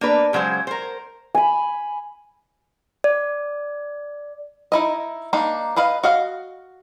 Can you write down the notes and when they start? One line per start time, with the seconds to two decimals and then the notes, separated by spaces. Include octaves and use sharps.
0.01 A#3 D4 B4
0.33 C#3 F#3 G#3 C5
0.67 A#4 C5
1.35 G#5 B5
3.04 D5
4.72 D#4 E4 D#5
5.33 A#3 D4 D#4
5.76 G#4 B4 D#5 F5
6.03 F#4 D#5 F5